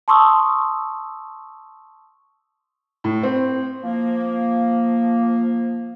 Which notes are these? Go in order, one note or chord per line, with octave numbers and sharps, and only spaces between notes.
A5 C6 C#6 D#6 E6
A2
C4
F3 A#3